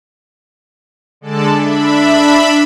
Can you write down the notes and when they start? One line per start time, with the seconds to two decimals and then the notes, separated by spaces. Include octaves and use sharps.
1.21 D3 G#3 A4 D5 A5
1.55 D4 E5 B5